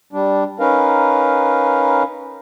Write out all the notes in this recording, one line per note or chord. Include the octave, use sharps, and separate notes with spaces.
G3 D4
C#4 D#4 A#4 B4 F5